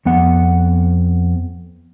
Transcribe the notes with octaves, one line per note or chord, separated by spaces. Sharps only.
F2 B3 F#5